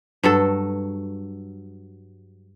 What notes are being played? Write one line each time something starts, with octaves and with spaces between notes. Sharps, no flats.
G2 F#3 A4